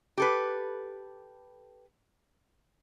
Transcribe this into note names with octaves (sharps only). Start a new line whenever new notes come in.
G4 A4 B4